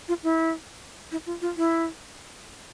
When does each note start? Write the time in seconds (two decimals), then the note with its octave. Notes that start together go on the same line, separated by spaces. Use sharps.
0.08 F4
0.23 E4
1.12 E4
1.26 F4
1.42 F4
1.57 E4